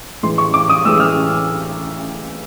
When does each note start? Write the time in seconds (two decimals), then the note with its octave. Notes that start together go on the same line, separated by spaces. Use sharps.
0.23 A2 E3 G#3 C6
0.38 C#6
0.54 D6
0.69 D#6
0.85 A2 E3 G#3 E6
1.00 F6